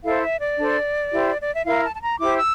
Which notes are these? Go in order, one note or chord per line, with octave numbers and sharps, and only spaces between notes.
E4 A4 C5 F5
E5
D5
D4 A4 C5
E4 G4 C5
D5
E5
E4 A#4 F5
A5
A5
A#5
E4 G4 C5 D6
E6